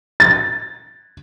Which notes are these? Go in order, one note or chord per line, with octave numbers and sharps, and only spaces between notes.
A6